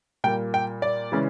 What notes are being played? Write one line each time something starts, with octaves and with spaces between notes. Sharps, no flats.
A#2 G3 A#3 G5
G5
D5
C#3 E3 G#3 C#4